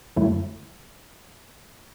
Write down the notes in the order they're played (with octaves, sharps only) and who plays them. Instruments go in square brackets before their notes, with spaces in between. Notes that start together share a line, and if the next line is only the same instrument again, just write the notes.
[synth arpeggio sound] F#2 D3 F#3 A3 E4